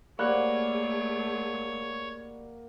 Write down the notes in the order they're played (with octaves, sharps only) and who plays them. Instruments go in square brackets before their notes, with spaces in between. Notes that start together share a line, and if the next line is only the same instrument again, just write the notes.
[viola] A3 G#4 [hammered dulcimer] A#3 F#5 [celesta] G4 D5 B5 [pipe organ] C#5